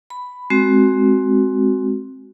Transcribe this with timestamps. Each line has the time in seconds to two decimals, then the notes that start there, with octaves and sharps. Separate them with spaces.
0.10 B5
0.50 G#3 C4 F#4